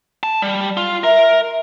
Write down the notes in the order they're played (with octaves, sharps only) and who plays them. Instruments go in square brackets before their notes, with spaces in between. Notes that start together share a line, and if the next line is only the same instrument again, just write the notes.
[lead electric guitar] A5
G3
F4
[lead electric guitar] A#4 [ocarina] E5